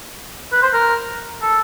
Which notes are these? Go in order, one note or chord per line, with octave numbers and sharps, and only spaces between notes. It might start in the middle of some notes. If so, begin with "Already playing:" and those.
B4
C5
A#4
A4